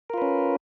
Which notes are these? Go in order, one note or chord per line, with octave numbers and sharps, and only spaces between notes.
C#4 F4 A#4 B4